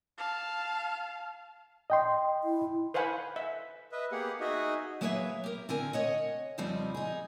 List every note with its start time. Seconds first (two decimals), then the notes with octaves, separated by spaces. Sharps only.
0.17 F5 A5
1.90 D#5 G5 C6
2.44 E4
2.94 B4 C5 F5 F#5 G#5 B5
3.36 E5
3.92 B4 D#5 E5
4.12 A#3 B3 G4 G#4 F#5
4.40 D#4 F#4 G#4 D#5 E5
5.01 F#3 A#3 G#4 B4 C#5 E5
5.44 G4 A#4
5.69 D3 C4 A#4 G#5
5.93 C#5 D#5 F#5
6.58 F2 C#3 F3 G3 C4 D#4
6.95 D#4 G#4